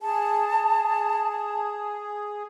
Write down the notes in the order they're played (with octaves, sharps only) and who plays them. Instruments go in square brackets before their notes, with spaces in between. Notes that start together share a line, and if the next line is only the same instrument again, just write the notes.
[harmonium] G#4 [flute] A5